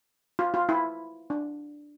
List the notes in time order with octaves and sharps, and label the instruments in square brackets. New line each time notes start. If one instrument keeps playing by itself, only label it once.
[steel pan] F4
F4
E4
D4